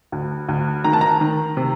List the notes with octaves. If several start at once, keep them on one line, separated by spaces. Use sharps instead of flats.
D2
D2
D#3 A#5
A5
A#5
D#3
C3